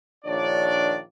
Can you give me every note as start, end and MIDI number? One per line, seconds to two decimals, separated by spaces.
0.25 0.98 34
0.25 0.98 51
0.25 0.98 62
0.25 0.98 73
0.25 0.98 74